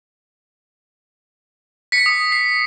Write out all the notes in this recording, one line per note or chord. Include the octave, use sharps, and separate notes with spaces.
B6 C#7
D#6
C7